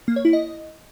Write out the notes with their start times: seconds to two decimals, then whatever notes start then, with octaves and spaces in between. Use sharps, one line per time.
0.08 A#3
0.16 C#5
0.25 E4
0.33 D#5